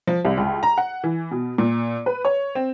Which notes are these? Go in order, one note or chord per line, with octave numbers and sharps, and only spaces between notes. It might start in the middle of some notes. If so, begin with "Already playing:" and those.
F3
C2
C#2
A#5
F#5
E3
B2
A#2
B4
C#5
C4